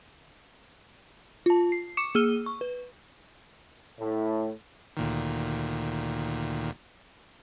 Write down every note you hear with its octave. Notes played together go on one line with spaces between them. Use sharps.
F4 A5
C7
C#6 D6 C#7 E7
A#3 G#4 E6 F6 D#7 G7
C#6
B4
A2
D2 A#2 D#3